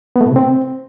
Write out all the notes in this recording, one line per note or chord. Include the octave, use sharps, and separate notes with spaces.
B3
A3
A2
C3
C4